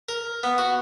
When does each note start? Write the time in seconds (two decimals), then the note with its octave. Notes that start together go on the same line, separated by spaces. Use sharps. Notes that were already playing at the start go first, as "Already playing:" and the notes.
0.09 A#4
0.43 B3
0.58 F#4